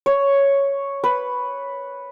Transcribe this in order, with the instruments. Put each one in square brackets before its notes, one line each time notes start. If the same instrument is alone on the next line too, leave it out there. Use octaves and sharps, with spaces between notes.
[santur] C#5
B4